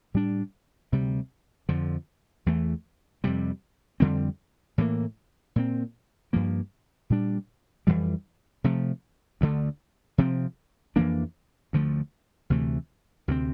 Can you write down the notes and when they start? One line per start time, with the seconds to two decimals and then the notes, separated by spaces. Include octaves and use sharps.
0.14 A2 G3 D4
0.92 D2 C3 G3
1.69 F2 D3 F3
2.46 E2 E3 A3
3.24 F2 C3 G3
4.00 F2 D3 G3 C4
4.78 A2 E3 G3 A#3
5.56 A#2 G3 C4
6.33 G2 F3 A#3
7.10 A#2 G3 D4
7.87 F2 C3 E3 G3
8.64 C3 F3 A3
9.41 D2 D3 A3
10.18 C3 F3 C4
10.96 F2 E3 A#3 D4
11.73 D2 D3 F3 A3
12.50 D2 C3 E3 A3
13.28 D2 C3 F3 C4